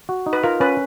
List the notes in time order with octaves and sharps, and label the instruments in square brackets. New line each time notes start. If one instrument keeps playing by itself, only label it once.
[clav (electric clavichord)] F#4
D#4
[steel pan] B4
[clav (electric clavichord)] F4 [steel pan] A#4
[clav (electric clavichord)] C#4 [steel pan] B4